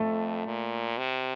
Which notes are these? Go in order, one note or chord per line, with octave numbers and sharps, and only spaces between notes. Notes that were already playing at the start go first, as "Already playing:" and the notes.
Already playing: F2 A3 A4
A#2
C3